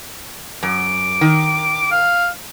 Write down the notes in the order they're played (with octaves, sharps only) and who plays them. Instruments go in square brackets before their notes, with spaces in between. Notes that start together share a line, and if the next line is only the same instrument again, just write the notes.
[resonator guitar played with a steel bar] F#2 [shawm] D6
[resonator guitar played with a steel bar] D#3
[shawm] F5